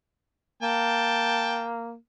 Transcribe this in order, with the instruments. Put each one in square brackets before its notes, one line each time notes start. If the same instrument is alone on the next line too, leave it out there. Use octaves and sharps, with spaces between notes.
[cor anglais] A#3 [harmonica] G5 A5